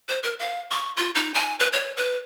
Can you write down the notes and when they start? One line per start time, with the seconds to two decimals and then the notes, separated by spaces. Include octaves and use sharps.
0.09 C5
0.23 A#4
0.39 F5
0.71 C#6
0.97 F4
1.15 D#4
1.34 G#5
1.60 B4
1.73 C#5
1.97 B4